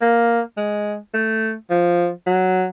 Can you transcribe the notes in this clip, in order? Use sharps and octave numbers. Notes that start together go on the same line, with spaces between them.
A#3
G#3
A3
F3
F#3